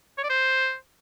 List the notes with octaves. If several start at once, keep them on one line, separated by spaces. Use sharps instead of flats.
C#5
D5
C5